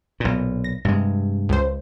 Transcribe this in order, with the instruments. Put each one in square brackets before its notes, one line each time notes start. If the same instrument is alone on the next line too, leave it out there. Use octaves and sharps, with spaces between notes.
[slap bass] B1 A#2
[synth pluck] A#6
[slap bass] G2 C3 G#3
[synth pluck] C#2 C5